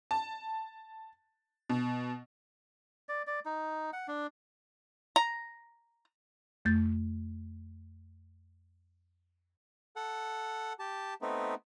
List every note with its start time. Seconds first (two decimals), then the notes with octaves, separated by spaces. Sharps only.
0.11 A5
1.69 B2
3.09 D5
3.27 D5
3.46 D#4
3.93 F#5
4.08 D4
5.16 A#5
6.65 F2 A3 G6 A6
9.96 A4 F#5
10.79 G4 A5
11.22 A3 B3 C4 D#4